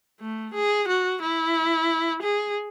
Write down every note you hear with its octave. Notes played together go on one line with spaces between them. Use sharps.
A3
G#4
F#4
E4
G#4